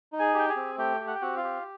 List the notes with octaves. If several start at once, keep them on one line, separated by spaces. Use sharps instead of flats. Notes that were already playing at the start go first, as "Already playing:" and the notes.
D#4
G#4 G#5
G4 G5
G#4 G#5
C4
A3 G4 G5
G4
F#5
G5
C4 F#4 F#5
F4 F5
G4